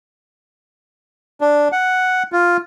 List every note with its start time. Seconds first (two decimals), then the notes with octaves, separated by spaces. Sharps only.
1.41 D4
1.72 F#5
2.32 F4